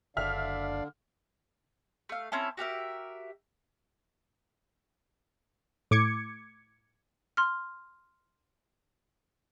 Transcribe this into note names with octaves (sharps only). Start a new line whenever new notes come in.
F#1 D3 D4 D5 E5 F5 F6
A3 F5
C4 C#4 E4 A4
F#4 G4 A#4 E5
A2 D6 G#6 C#7
C6 F6